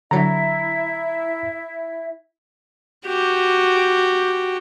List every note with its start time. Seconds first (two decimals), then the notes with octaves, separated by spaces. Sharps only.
0.11 D3 F#3 E4 E5 A#5
3.07 F#4 G4